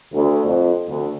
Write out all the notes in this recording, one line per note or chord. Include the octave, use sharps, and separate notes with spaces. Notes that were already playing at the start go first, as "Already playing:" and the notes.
D2
F2
D2